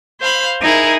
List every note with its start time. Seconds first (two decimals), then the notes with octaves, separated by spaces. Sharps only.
0.19 C5 F5 B5
0.62 D#4 E4 G#4 A#4